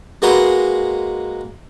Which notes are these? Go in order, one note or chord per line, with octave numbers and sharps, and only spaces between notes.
G#3 A#3 F#4 B4 A#5 C6